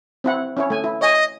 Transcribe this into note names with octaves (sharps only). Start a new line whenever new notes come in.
C4 E4 F#5
C#4 E4 C#5
A3 G#5
E4
C#5 D#5 G#5